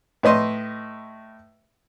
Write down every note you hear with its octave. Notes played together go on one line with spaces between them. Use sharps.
A2 B4 D#5 C6